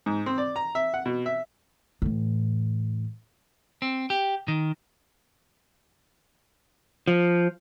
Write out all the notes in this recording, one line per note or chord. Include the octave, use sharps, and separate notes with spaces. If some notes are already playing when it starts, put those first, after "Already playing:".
G#2
C4
D5
A#5
E5
F#5
B2
E5
A2 E3
C4
G4
D#3
F3